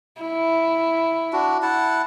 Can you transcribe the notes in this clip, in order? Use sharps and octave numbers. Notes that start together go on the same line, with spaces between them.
E4
D4 F#4
E4 F#5 A5